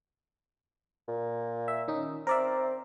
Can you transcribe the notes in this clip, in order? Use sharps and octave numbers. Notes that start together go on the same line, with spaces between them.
A#2
E5
D#3 C#4 D#4
C4 A#4 D5 E5